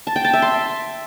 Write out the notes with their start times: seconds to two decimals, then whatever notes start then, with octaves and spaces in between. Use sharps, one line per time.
0.07 A5
0.16 G5
0.25 A5
0.33 E5
0.42 C6